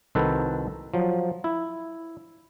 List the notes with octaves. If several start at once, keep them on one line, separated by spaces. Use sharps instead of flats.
C2 D#3 F#4 A4 B4 C5
F3 F#3
E4